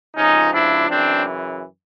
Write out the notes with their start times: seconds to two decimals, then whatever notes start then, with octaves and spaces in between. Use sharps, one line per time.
0.15 C#2 C3 F3 C#4 D#4
0.52 D4 E4
0.89 F#2 C#3 E3 C4 D4